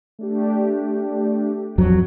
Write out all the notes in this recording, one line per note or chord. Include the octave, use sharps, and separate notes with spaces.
A3 D4 G4
F2 F#3